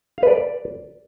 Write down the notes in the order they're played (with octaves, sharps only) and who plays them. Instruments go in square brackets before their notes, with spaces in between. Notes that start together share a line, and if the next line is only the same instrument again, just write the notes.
[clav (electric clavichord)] F5
B4
D5